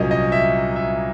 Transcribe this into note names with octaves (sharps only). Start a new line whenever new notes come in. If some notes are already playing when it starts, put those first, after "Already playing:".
Already playing: C2 A#2 F#3 A#3 C#4 D#5
D#5
E5
E5